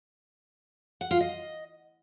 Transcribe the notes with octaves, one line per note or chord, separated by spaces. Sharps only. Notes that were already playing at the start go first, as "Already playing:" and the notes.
F#5
F4
D#5